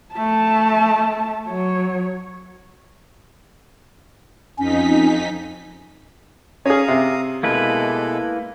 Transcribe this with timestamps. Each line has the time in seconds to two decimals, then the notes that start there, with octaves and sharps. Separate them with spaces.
0.13 A3 A5
1.48 F#3 C#5
4.58 F2 C#4 D#4 B6
6.65 C#4 G#4 F5 A#5 D#6
6.88 C3
7.43 B2 G#3 A#3 E4 A4 B4